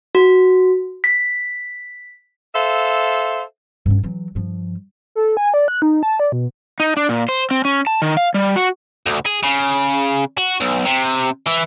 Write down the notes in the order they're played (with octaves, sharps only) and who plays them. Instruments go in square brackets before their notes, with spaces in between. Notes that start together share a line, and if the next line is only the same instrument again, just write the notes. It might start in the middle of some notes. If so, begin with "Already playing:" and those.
[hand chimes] F#4
B6
[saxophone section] A4 C5 E5 F5
[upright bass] G2 C#4
E3 F#3
G2 F3
[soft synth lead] A4
G#5
D5
F#6
D#4
A5
D5
B2
[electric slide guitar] D#4
D4
A#2
C5
C4
C#4
A5
D#3
F5
G3
F#4
[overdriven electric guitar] D2
G#4
C#3
F#4
B1
C3
E3